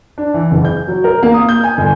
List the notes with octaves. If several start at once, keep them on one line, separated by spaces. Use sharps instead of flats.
D4
E3
F#1
G6
F#3
A#4
A#3
D#6
G6
G#5
G1